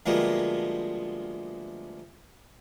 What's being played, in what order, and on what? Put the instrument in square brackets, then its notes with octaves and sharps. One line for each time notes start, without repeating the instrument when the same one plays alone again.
[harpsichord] D2 F3 G3 G#3 A#3 B3